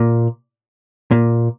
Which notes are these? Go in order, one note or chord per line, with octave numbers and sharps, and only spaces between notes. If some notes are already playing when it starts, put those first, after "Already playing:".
Already playing: A#2
A#2